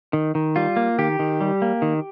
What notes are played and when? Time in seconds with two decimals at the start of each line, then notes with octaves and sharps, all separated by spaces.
0.13 D#3
0.35 D#3
0.56 G3 F4
0.76 A#3
0.98 D#3 G4
1.19 D#3
1.41 G3
1.62 A#3
1.82 D#3